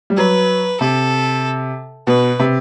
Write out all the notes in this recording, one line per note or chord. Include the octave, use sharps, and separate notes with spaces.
G3
F#3 B4
C3 A4
B2 B4
C3